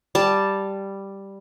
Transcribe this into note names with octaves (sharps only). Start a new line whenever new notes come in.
G3 A5